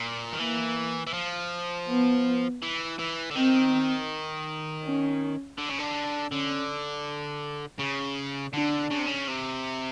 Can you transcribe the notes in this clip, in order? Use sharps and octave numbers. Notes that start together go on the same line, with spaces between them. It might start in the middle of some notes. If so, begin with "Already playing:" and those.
Already playing: A#2
D#3
E3 A#3
E3
F3
B3
E3
E3
D3
D#3 C4
C#4
D3
C#3
D3
D3 C#4
C#3
D3 D4
C#3
C3
C#3
C3